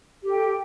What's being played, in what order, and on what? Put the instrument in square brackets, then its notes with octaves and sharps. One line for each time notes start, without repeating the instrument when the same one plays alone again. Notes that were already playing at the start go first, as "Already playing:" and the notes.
[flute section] G4
A4
G5